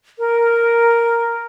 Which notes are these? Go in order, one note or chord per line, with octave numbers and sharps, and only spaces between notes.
A#4